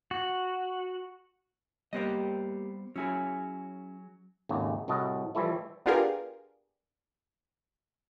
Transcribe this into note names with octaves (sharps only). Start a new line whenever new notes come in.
F#4
G3 A#3 B3 G4 C5 D#5
F#3 C#4 E4 G#4 G#5
G#1 D#2 C#3 A3
C2 A2 F#4 D#5 A5
E3 F3 G3 A3 E4
B3 D4 F4 G4 G#4 A#4